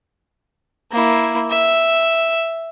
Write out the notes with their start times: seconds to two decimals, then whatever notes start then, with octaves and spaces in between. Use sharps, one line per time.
0.92 A#3 E4
1.50 E5